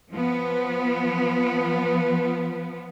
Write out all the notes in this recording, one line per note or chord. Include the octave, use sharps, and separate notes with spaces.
F3 B3